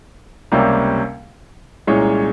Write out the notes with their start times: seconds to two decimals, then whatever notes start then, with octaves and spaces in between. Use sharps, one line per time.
0.52 C#2 C3 G3 A#3 C#4
1.87 C2 A#2 G#3 C#4 C#5